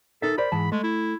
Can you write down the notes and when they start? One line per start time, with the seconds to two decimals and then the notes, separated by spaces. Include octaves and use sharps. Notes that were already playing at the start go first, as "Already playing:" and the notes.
0.22 D#4 A4 A#4 E5
0.38 A#4 C5 D5 B5
0.52 G#2 E3 A5
0.72 G#3 A3
0.84 E4